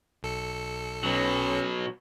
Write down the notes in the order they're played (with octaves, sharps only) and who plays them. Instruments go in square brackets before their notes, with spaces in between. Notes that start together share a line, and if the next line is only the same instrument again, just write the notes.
[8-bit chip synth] B1 A4 C#7
[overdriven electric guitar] B2 F#3 [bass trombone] C#4